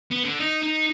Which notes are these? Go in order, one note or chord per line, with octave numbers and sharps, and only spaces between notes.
B3
D3
D#4
D#4